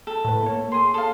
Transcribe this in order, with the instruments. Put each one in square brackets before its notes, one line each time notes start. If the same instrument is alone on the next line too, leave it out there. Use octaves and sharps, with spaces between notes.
[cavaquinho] A4
[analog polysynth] A2 B4
A#3 C#5
[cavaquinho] G#4 C6
A4 F5